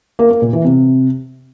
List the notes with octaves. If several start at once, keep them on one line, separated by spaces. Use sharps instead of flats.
A#3
A#3
A#2
E3
C3